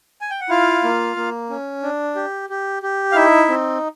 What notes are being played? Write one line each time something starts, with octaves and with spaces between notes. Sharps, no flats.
G#5
G5
F#5
E4 F4 F5
A#3
A#3
C#4
D4
G4
G4
G4
F5
D#4 E4 E5
C4